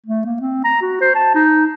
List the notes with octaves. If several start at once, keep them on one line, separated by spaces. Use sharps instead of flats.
A3
A#3
C4
A#5
F#4
C5
A5
D#4